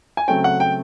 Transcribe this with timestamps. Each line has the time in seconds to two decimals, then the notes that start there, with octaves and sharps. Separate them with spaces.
0.17 G#5
0.28 C#3 F#3 A3 C4 G5
0.44 F#5
0.60 G5